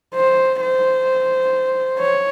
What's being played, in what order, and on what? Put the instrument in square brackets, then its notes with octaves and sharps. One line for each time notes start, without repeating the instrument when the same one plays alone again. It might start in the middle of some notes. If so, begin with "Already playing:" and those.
[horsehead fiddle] C5
C5
C#5